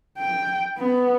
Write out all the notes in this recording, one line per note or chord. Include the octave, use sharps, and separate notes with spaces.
G5
B3